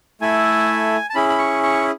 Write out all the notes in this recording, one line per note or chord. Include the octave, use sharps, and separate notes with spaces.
A3 E4 A4 G#5
A5
C#4 E4 G#4 B5
B5
C#6
C#6